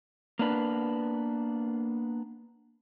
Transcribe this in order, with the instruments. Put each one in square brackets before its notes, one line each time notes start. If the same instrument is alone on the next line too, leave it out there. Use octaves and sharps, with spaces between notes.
[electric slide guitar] A#3 B3 D4 B4